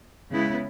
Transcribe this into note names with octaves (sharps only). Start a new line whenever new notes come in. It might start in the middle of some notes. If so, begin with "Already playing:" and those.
C#3 G#3 B3 E4